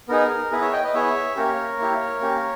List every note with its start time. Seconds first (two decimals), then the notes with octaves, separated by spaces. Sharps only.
0.08 B3 D#4 G#4 A#4
0.52 B3 E4 G#4 B4
0.61 C#5 E5
0.72 D#5 G5
0.83 B4 D#5
0.94 B3 E4 G#4 C#5 E5
1.36 A#3 C#4 G4 A#4 C#5
1.79 A#3 E4 G4
2.21 A#3 C#4 G4